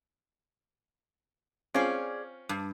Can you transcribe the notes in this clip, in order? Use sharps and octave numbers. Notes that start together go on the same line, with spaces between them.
C4 C#4 F4 G#4 D5
G2